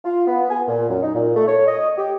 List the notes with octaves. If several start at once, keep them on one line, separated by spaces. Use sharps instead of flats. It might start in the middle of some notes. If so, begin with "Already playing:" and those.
F4
B3
G#5
A#2
F#2
D#4
A#2
A3
C#5
D#5
G4